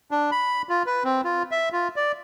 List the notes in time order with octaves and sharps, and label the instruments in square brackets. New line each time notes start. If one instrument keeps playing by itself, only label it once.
[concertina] D4
B5
F4
B4
C4
F4
E5
F4
D5